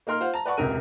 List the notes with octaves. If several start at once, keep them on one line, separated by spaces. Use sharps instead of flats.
A#3 D#4 A#4 C6 F6
F4 C5 F5 F#5
A5 A#5
B4 D5 F#5 A5 C#6
E1 C#2 C3 A#4 D#7